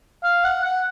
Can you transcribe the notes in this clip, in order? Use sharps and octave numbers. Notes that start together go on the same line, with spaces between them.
F5
F#5
F#5